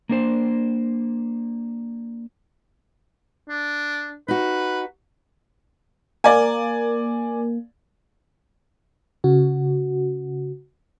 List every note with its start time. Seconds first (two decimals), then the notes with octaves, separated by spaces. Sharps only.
0.09 A#3 D4 C5
3.49 D4
4.28 D#4 F#4 B4
6.24 A#3 D5 G#5
9.24 C#3 F#4